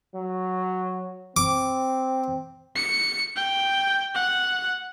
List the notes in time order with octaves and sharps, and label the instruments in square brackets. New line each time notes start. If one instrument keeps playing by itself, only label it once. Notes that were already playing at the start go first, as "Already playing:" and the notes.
[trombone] F#3
[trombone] C4 [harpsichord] D6
[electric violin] C#7
G5
F#5